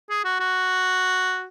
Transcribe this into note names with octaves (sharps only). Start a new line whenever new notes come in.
G#4
F#4
F#4